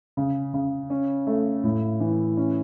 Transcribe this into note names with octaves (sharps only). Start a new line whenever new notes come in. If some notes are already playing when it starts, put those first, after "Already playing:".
C#3
C#3
C#4
A3
A2
E3
C#4